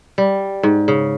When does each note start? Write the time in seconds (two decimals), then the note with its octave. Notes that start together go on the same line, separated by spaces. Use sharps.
0.18 G3
0.63 G#2
0.88 C#3